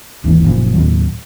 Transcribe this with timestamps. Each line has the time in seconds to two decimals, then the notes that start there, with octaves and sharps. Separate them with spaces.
0.24 G#1 D#2 E3
0.44 F#1 A#2 F3
0.73 D#2 A2 D#3 F#3